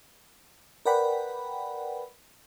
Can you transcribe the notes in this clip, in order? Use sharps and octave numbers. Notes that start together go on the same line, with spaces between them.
A#4 B4 D5 F#5 G5 B5